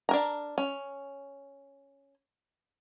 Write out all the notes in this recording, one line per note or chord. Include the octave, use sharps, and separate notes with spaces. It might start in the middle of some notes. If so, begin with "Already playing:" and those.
D4 A#4 A#5
C#4